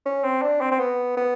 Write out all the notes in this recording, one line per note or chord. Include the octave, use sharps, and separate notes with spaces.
C#4
C4
D4
C4
C4
B3
B3